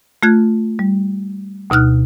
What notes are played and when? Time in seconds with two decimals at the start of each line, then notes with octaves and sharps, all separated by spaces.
0.23 A3 F4 F#6 G#6
0.79 G3
1.70 D2 B2 D#4 F6 F#6